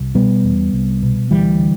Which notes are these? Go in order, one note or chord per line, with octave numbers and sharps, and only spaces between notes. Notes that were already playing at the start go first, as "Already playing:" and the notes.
Already playing: C2
B2 G3 B3
E2
C2
B2
D2 E3 G3
D3